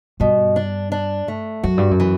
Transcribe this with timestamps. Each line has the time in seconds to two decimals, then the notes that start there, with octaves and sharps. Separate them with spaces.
0.20 G2 B2
0.56 D4
0.92 D4
1.28 A3
1.63 F#2 F#4
1.78 G2
1.91 F#2
2.00 E3